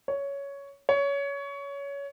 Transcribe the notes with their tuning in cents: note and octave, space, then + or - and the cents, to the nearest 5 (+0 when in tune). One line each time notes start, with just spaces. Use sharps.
C#5 +10
C#5 +20